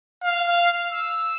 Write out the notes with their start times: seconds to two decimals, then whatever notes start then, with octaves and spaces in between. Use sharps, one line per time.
0.23 F5
0.92 E6